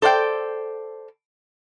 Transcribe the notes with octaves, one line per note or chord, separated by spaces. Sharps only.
A4 C5 D5 F#5 G5